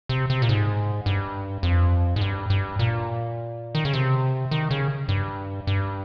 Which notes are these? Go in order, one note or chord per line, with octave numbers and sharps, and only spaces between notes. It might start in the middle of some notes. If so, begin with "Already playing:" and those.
C3
C3
A#2
G#2
G2
F2
G#2
G2
G2
A#2
D#3
C#3
C3
D#3
C#3
G2
G2